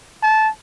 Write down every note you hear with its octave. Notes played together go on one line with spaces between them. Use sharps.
A5